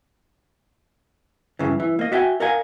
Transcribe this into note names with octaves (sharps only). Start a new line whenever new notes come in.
G2 C#3 E3
E3
A#3 D#5
F#4 E5 F5 G5 G#5
A#4 D#5 F5 F#5 G#5